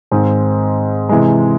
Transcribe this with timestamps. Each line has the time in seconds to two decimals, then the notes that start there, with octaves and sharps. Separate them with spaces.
0.11 G#2 D#3 G#3 C4
1.09 C3 E3 G#3